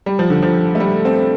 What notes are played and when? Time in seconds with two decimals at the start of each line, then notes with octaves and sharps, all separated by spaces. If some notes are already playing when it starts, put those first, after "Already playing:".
0.06 G3
0.19 F3
0.30 D3
0.43 F3
0.75 A3
0.80 G3
1.05 C4